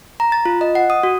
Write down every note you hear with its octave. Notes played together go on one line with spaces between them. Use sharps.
A#5
A6
F4
D#5
F#5
D#6
F#4